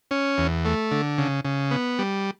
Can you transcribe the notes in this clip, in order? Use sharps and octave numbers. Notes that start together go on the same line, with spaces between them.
C#4
E2
A3
D3
C#3
C#3
B3
G3